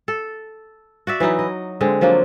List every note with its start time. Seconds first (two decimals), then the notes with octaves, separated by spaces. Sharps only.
0.08 A4
1.07 F#4 D5 E5
1.20 E3 F#3 D#4 E4
1.39 D#5
1.81 D3 G#3 C4
2.01 F3 F#3 A#3 D4